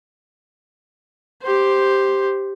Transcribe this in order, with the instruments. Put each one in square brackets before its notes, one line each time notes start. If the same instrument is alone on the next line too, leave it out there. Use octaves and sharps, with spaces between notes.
[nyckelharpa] G4 C5